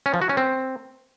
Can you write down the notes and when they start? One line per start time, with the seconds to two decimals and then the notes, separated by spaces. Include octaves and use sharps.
0.06 C#4
0.14 F3
0.22 F#4
0.29 C#4
0.37 C4